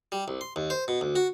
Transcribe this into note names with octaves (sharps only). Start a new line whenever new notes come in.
G3
C2
C6
D#2
C5
B2
D2
F#4